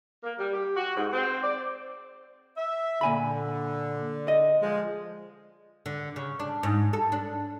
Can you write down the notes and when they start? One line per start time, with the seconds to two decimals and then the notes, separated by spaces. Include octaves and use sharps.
0.23 A#3
0.38 G3
0.53 G4
0.77 F#4
0.96 G#2
1.13 C4
1.43 D5
2.57 E5
3.01 A#2 D3 G#5 B5
4.28 D#5
4.61 F3 G#3
5.86 D3
6.16 C#3
6.40 D4
6.63 G#2
6.93 A4
7.12 D4